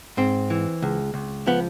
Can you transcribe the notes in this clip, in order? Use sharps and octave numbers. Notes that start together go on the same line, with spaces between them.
G#2 C4
E3
C#2
C#2
F3 B3